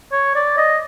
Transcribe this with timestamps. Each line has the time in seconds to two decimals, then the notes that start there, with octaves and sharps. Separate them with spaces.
0.12 C#5
0.35 D5
0.57 D#5